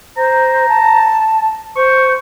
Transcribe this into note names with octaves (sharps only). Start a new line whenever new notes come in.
C5 A#5
A5
C5 C#6